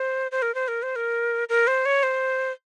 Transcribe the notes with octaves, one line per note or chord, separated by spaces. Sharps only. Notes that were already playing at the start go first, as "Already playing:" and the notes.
Already playing: C5
C5
A#4
C5
A#4
C5
A#4
A#4
C5
C#5
C5